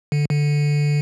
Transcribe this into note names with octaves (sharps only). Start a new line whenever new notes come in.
D3
D3